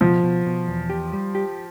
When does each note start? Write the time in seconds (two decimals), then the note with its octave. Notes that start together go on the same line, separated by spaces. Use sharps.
0.01 B2 F3
0.23 B2
0.46 B2
0.68 E2
0.90 G4
1.13 G3
1.35 G4